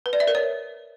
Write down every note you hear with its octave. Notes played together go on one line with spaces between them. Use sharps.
B4
D5
E5
A#4
C#5